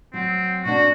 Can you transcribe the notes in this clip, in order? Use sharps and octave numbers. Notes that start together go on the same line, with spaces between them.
F#3 C4
B2 D4 F#4